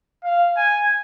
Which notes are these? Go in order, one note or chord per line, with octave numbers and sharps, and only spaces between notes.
F5
G#5